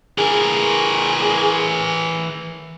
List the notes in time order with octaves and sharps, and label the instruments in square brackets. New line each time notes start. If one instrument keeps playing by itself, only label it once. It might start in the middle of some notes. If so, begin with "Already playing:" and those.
[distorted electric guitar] E3 A#4 [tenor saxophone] G#4